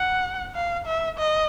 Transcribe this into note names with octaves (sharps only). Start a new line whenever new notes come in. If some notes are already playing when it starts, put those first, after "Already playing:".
Already playing: F#5
F5
E5
D#5